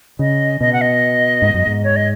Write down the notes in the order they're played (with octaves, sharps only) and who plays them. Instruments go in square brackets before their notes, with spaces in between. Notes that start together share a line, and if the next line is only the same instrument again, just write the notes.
[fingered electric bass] C#3 [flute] D#5
[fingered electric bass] B2 [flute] D#5
[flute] F#5
D#5
[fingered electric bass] G#2
F#2
G#2
[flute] C#5
D#5